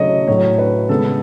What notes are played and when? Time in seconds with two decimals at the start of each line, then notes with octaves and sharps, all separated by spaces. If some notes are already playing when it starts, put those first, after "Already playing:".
Already playing: C#3 F#3 A3 C#5 D#5
0.28 A2 F#3 A3 C#5
0.59 B4
0.89 C#3 G#3 B3 A4